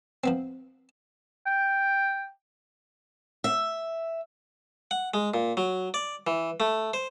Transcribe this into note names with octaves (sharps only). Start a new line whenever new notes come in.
F3 B3 C4
G5
E5
F#5
G#3
A#2
F#3
D5
E3
A3
C5